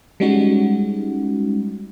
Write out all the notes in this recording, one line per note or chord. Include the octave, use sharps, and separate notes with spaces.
G3 G#3 C#4 D#4 F#4